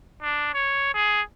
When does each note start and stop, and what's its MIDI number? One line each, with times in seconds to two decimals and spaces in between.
0.22 0.52 62
0.54 0.93 73
0.94 1.22 68